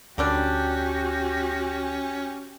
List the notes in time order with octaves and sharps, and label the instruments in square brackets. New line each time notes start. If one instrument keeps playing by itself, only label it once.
[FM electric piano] D2 [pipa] D3 G3 D4 [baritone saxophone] C#4 [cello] F#4 G4